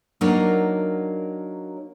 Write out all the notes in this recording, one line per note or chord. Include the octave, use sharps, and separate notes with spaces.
F#3 A#3 D4 D#4 A#4 C#5